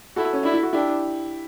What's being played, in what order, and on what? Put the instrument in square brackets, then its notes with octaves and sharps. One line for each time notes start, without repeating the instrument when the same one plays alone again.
[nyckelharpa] E4 [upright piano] F#4 A4
[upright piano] C#4
[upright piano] D4 [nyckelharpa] E4
[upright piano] E4
F#4
[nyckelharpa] D4 [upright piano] E4 G4